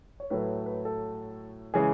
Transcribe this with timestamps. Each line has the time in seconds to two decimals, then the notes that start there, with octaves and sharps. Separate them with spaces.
0.20 C#5
0.30 A2 F#3 A3 B4
0.66 B4
0.85 A4
1.74 C#3 E3 G#3 G#4